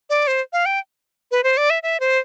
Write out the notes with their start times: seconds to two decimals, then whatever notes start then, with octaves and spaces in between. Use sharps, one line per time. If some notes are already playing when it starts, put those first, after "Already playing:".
0.10 D5
0.27 C5
0.53 F5
0.66 G5
1.31 B4
1.44 C5
1.57 D5
1.70 E5
1.83 E5
2.00 C5